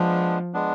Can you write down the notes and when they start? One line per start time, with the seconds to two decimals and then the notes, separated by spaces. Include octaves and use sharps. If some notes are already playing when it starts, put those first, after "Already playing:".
Already playing: F3 G#3 B3 D4
0.54 G#3 B3 D4